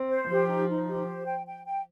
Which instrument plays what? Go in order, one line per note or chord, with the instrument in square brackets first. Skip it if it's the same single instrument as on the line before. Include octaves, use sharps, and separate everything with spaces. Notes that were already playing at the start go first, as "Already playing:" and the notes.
Already playing: [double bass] C4
[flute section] C5
[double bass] F3 [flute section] G4
[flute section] D#4
D#4
G4
C5
G5
G5
G5